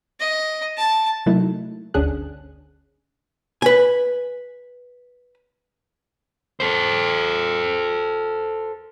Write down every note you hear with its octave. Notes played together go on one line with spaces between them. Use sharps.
D#5
A5
C3 F#3 A3 A#3 D#4 E4
G1 D2 C#4 D4 G#4 F#6
B4 G#5
A4 C5